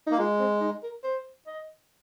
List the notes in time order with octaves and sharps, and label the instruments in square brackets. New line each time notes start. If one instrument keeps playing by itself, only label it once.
[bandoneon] A#3 [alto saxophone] D#4
[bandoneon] G#3 [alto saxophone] F4
[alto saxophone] C4
D#4
A#4
C5
D#5